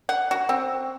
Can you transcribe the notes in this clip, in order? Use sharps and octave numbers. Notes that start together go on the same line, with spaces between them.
F#5
F#4
C4